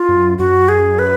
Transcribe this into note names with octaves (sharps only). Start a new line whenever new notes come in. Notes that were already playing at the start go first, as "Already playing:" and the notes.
Already playing: F4
F#2
F#2 F#4
G#4
B4